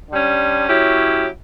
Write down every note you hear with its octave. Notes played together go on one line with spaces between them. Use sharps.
D3 G3 C#4
F#3 C#4 E4 G4